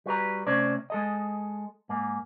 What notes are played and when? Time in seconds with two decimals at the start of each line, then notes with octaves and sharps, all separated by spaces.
0.06 G3 F#4 B4 A#5
0.47 C3 A3 C#4 C5 D5
0.90 G#3 A4 D#5
1.89 G#2 A#3